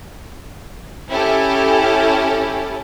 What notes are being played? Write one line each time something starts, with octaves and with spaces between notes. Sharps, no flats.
C#4 E4 G4 A4